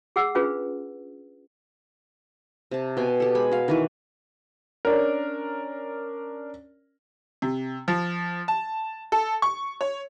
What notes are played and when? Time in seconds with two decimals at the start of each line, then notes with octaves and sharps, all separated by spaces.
0.16 G#4 F#5 E6
0.35 C#4 D4 F4 G#4 B4
2.71 C3 A5
2.97 B2 G5 G#5
3.20 G4 A4
3.35 G#3 G#5 B5
3.51 F#4 F5
3.68 D#3 E3 B4
4.85 C#4 D4 A#4
7.42 C3
7.88 F3
8.48 A5
9.12 A4
9.42 C#6
9.81 C#5